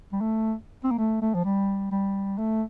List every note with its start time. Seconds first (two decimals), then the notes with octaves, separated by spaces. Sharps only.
0.13 G3
0.21 A3
0.84 C4
0.91 A#3
0.98 A3
1.22 A3
1.34 F3
1.45 G3
1.91 G3
2.38 A3